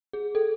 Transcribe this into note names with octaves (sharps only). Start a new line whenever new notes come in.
G#4
A4